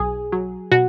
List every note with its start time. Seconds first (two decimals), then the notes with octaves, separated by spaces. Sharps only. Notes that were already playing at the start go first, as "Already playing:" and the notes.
Already playing: B1 G#4
0.32 F#3
0.71 B2 F#4